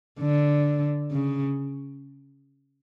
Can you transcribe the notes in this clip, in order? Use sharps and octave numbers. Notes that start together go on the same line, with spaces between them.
D3
C#3